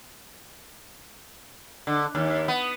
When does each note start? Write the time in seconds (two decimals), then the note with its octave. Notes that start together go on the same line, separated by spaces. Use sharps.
1.87 D3
2.15 D#2
2.48 B3